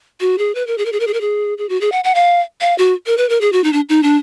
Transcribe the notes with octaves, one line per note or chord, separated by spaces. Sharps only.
F#4
G#4
B4
A#4
G#4
A#4
G#4
A#4
G#4
A#4
G#4
G#4
F#4
G#4
F#5
F#5
F5
F5
F#4
A#4
B4
A#4
G#4
F#4
D#4
D4
D#4
D4